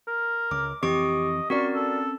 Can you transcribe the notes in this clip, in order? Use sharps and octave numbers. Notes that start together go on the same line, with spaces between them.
A#4
C#2 D6
F2 E3 C4 G4 D#5 C#6 D7
C4 C#4 F#4 A#4 D5 C#6
A4